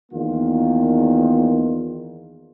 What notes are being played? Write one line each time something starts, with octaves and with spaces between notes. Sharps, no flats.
E2 D#3 A#3 F4